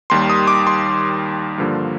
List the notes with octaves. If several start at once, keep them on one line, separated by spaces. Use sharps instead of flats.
D#2 D#3 G3 C6
D#6
D6
C6
G2 D3 F3 A#3